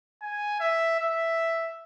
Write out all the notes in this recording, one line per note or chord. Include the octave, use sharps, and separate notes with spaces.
G#5
E5
E5